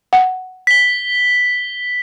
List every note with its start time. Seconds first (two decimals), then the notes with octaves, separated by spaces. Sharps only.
0.13 F#5
0.67 B6 G7